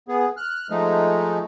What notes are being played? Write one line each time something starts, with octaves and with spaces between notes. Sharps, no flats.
B3 G#4
F6 F#6
F3 G#3 A3 D#4